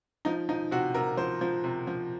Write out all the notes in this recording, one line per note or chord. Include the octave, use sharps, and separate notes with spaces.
F3 D#4
F3 D#4
C3 F#4
C3 A#4
F3 C5
F3
C3
F3